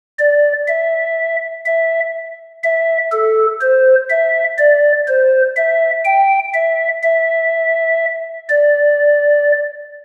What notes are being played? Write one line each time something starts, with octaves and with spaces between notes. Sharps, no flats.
D5
E5
E5
E5
A4
C5
E5
D5
C5
E5
G5
E5
E5
D5